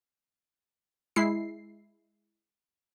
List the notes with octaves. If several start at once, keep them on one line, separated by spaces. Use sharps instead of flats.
G#3 E4 C7